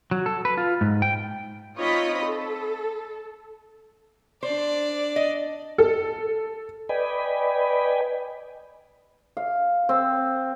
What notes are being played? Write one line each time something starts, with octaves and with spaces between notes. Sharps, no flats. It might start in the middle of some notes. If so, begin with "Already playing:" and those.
F#3
A4
B4
F4
G#2
G5
C4 D#4 F4 C#5 D#5 B5
A4
D4 C5 D5
D#5
A4
B4 D5 D#5 G5 G#5 B5
F5
C4